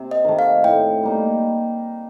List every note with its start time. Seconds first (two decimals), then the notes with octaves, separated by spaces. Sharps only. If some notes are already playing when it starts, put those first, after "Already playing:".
Already playing: C3
0.11 D#5
0.24 D#3 A3
0.39 F5
0.64 A2 G5
1.03 G3 A#3 D#4